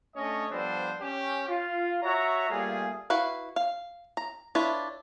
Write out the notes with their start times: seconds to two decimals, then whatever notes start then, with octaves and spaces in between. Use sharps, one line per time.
0.16 A3 C#4 D4 C#5 D#5
0.51 F3 G3 B3 D4 A4 C5
1.01 C#4 G4
1.48 F4
2.02 F#4 C#5 E5 A#5
2.50 G3 A3 A#3 F4 G#4
3.10 E4 F#4 B4 F5
3.56 F5
4.17 A#5
4.55 D4 E4 F4 B4 C#5